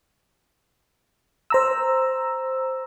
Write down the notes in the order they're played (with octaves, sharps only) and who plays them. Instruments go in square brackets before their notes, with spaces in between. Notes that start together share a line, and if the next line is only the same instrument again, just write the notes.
[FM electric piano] C5 A#5 E6